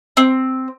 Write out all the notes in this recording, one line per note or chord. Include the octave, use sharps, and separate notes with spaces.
C4